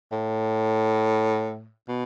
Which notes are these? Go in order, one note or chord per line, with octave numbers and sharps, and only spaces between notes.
A2
B2